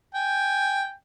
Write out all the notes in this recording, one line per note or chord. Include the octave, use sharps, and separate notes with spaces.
G5 G#5